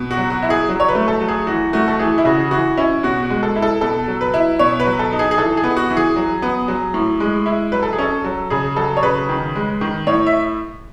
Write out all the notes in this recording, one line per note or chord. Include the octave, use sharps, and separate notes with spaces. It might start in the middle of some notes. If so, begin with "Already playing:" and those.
Already playing: B2
F#4
F#3
F#4
E4
G#4
F#3
C#5
B4
A3
A4
F#3
G#4
E3 F#4
A3 F#4
A4
E3 G#4
E4
C#3 F#4
E3 F#4
C#4 E4
B2 F#4
F#4
G#3
A4
E4
A4
B2 A4
F#3
B4
E4
B2 C#5
B4
F#3
A4
D#4
G#4
G#4
E3 A4
G#4
B3
F#4
E3
G#4
F#3
B3
F#3
A2
G#3
E4
F#3 B4
A4
G#4
C#4 A4
F#3
C#3 G#4
F#3 A4
C#5
C#3 B4
D#3
G#3
D#3
A2 C#5
E5